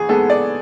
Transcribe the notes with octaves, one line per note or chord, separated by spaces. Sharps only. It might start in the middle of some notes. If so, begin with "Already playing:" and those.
Already playing: A1 G#4
G#2 G#3 B3 A4
D5